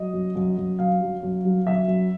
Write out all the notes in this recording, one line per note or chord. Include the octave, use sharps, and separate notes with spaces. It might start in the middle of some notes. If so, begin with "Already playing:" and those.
Already playing: F#3 D#5
F#2
F#2
F#2
F#2 F5
F#3
F#2
F#3
F#2 E5
F#2